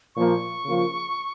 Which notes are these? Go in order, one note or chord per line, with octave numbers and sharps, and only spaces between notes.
A#2 F3 A#3 C#6
C#3 F3 A#3 F4